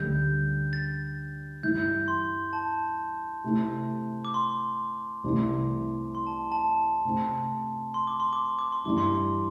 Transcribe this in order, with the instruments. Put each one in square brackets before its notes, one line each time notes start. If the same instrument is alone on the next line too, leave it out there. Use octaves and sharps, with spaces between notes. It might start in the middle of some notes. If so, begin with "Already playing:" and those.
Already playing: [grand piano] D2 D3 G3 D4 [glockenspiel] G6
[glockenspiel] A6
[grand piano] G2 E3 G3 E4 [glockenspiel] G6
[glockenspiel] C6
A5
[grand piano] C3 A3 E4
[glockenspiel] D6
C6
[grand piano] C2 C3 E3 A3
[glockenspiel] C6
A5
A5
[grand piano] C3 A3 C4
[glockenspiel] C6
D6
C6
D6
C6
D6
C6
[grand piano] G2 E3 G3 E4 [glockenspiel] D6
[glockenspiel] C6